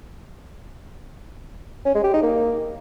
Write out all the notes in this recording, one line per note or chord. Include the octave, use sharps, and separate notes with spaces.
C#4
G#3
G4
D#4
A#3